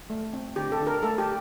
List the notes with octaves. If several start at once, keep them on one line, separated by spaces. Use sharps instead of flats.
A3
C4
D3 G4
A4
D3
A#4
A3 A4
G4